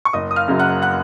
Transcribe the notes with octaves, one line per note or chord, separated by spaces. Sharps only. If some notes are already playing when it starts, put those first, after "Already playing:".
C#6
F#1 D#5 D#6
D#6
F5 F6
F#2 C#3 F#3
F#5 F#6
F#5 F#6